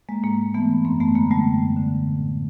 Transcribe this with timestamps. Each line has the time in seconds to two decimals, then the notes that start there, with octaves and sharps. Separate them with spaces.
0.09 G#3 A#3
0.23 G#2 G#3 A#3
0.54 E3 A3 B3
0.85 F#2 A#3 C4
1.00 A3 B3
1.15 D3 G#3 A#3
1.31 G3 A3
1.46 F#2
1.77 D3
2.07 A2